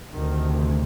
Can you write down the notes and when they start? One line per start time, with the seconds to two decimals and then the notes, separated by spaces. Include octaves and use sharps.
0.13 D2 C3 D#3